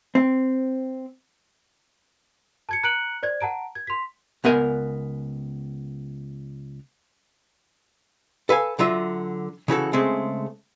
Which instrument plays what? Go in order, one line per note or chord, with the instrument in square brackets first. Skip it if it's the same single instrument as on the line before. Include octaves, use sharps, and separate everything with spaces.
[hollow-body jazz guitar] C4
[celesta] A5 G#6 C#7
A#5 F#6 C#7 D7 F#7
C5 D5 G#6
F#5 A5 A#5 D7
G#6
C6 B6
[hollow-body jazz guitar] C#2 B3 A#4 G#5
A4 B4 F5 G#5
D3 F#3 F4 E5
C#3 E3 F#4 A4
C#3 G#3 A3 C4